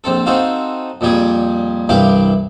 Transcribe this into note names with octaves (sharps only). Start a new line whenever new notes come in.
A#1 C4 A4
C4 D#4 F#4 A4 F5
F2 A#2 G3 G4 G#4
C2 G2 E3 G4 F5 D6